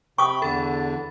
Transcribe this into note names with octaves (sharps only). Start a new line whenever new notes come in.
C3 G5 B5 C#6 D#6
E2 D3 A4 B5 A6